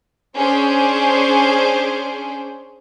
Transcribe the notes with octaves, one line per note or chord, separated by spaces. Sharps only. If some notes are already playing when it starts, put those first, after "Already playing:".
C#4 D4 G#4 C5